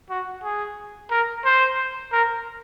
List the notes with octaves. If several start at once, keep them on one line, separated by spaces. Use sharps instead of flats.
F#4
G#4
A#4
C5
A#4